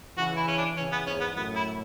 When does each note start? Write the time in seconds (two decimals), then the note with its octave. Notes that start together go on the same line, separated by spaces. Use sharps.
0.17 C#3 E3 F#4
0.37 E4
0.48 C#4
0.57 D4
0.77 C#3 E3 C#4
0.92 B3
1.06 E2 G#2 C#4
1.20 B3
1.36 F#2 A2 B3
1.56 E4